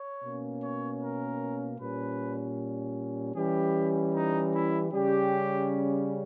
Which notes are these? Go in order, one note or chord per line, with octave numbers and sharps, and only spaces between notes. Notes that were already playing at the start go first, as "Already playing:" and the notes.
Already playing: C#5
B2 A#3 C#4
C#5
A#4
A#2 G3 C#4 B4
E3 G3 C#4 G4
D#4
E4
C#3 G3 C#4 G4